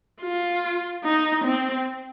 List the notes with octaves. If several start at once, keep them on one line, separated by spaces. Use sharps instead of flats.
F4
D#4
C4